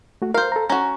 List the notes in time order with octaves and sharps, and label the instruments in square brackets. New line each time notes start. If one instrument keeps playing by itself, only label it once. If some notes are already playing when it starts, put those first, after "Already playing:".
[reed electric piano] A3 F#4
[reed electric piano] A#4 [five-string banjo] C5 F5
[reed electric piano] A4 A#5
[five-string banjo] C#4 F#4 [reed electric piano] A#5